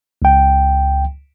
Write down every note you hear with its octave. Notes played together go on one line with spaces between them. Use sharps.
C#2 G5